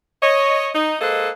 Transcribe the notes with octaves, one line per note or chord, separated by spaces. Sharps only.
C#5 D#5
D#4
G#3 A#3 A4 B4 C5 D#5